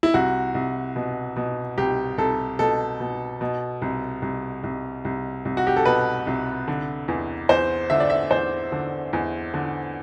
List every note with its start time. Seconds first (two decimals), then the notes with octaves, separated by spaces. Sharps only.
0.03 E4
0.14 C2 F#4
0.55 C2
0.96 B2
1.36 B2
1.78 C2 G4
2.18 C2 A4
2.59 B2 A4
3.00 B2
3.41 B2
3.82 C2
4.22 C2
4.63 C2
5.05 C2
5.45 C2
5.57 F#4
5.67 G4
5.76 A4
5.86 B2 B4
6.27 C2
6.68 D3
7.08 E2
7.49 E2 C5
7.90 D3 E5
8.00 D5
8.10 E5
8.31 E2 C5
8.72 D3
9.13 E2
9.54 D3